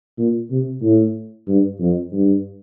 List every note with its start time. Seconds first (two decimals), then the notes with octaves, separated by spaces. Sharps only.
0.18 A#2
0.51 C3
0.82 A2
1.48 G2
1.80 F2
2.12 G2